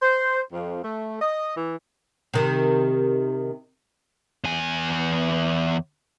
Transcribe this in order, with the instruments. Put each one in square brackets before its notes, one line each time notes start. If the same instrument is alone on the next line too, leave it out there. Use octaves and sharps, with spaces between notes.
[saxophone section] C5
F2
A3
D#5
E3
[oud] C3 D#3
[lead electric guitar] E2 G#5